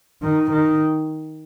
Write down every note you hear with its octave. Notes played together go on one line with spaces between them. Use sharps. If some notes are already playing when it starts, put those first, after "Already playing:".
D#3
D#3